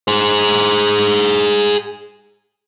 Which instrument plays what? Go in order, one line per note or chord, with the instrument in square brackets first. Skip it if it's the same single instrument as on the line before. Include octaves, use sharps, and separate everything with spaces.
[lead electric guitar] G#4 C5